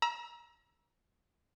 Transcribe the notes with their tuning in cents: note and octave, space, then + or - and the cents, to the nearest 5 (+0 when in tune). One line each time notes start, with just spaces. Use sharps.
A#5 +35 E6 +0